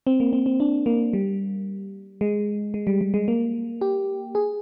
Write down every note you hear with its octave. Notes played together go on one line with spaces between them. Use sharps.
C4
A#3
C4
C4
D4
A#3
G3
G#3
G#3
G3
G3
G#3
A#3
G4
G#4